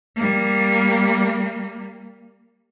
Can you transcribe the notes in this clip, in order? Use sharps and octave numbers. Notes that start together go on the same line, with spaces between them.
G3 A#3